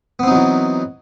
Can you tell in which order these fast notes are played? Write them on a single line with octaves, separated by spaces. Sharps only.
B3 C4 D#4 F#3 E3